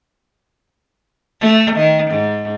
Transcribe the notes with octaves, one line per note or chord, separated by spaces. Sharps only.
A3
D#3
G#2